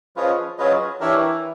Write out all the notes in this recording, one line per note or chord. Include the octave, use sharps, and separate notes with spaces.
F3 C#4 F4 G#4 B4 D#5
F#3 C#4 F4 G#4 B4 D#5
E3 D4 G4 A#4 C#5 E5